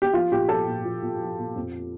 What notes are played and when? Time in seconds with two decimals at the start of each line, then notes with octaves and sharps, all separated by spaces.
0.02 G4
0.13 F3 F4
0.32 A#2 G4
0.49 F3 A4
0.68 A#2
0.85 F3
1.02 A#2
1.21 F3
1.39 A#2
1.56 F2